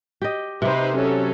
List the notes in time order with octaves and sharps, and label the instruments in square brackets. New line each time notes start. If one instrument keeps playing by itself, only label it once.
[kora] G4 D#5
[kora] C3 C4 [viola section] D#4 B4 C5
[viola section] F#3 C#4 A4